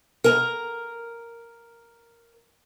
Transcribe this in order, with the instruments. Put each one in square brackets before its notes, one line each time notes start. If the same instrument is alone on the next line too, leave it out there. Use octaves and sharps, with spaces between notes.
[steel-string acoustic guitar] A#4 G#5 A#5